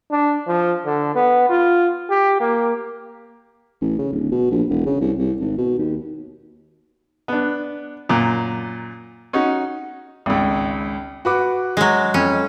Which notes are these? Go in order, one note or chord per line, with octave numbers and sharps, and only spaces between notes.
D4
F3
D3
B3
F4
G4
A#3
A1
C#3
D1
B2
A#1
E1
C#3
C2
C2
G#1
B2
D#2
B3 D4
F#2 A#2
C#4 D#4 F#4
G#1 C#2
F#4 B4 D6
F#3 G#3
F2 C#4